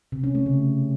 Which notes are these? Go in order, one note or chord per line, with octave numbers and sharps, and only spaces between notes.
C3
C#4
A3
C#3